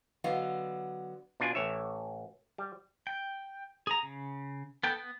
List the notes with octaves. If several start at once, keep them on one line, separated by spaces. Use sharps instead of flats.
D3 F#3 B3 D#5 F5
B2 D4 F4 G#5
A1 C#5 E5
G3
G5
G#4 A#5
C#3
B3 A4 G5
B3